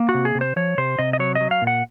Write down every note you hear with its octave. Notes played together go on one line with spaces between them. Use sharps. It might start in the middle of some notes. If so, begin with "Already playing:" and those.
Already playing: A#3
F#4
C3
G#4
C3
C5
F3 C#5
C3 C5
C3 D#5
D#5
F#3 C#5
D#5
F#3
F5
A#2
F#5